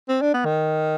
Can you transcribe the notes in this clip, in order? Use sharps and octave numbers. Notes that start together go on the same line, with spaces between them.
C4
D4
B3
D#3